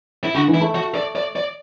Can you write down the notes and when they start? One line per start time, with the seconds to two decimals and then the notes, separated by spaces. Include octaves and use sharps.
0.24 E4
0.34 D3 F#4
0.48 E3
0.54 E4
0.61 A3
0.75 F#4
0.95 D5
1.16 D5
1.36 D5